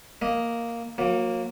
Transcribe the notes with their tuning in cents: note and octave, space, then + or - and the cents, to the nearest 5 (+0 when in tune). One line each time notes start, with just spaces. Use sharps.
A#3 +0 D#5 +0
F#3 -35 A#3 +0